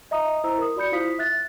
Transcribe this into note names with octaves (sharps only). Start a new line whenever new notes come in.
D#5 E5 A#5 D#6
E4 C5 A#5 E6
A#4 D#6
F#4 D5 B5 G6 C#7
E4 F4 C5 F5 D#6 B6
E5 F#6 A6